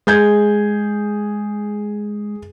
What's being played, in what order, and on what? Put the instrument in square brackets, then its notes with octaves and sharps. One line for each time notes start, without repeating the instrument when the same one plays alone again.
[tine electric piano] G#3 [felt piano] G#4 G6 G#6